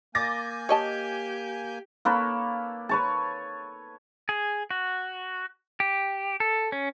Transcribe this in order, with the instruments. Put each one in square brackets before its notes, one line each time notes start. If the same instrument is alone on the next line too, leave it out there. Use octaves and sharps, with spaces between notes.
[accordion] A#3 G#5 G6 [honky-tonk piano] D6 A6 A#6
[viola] G4 [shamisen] C#5 D#5 A5
[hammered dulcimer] A#3 A4 B4 C#5
B4 C#5 A5
[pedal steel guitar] G#4
F#4
G4
A4
C#4